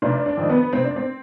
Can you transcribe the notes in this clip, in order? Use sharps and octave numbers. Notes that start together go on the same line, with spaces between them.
F1 D4
D4
F2 D#3
B3
F1 C4
D4
C4